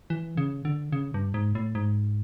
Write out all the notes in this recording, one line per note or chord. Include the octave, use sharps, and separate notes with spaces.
E3
C#3
D3
C#3
G2
G#2
A2
G#2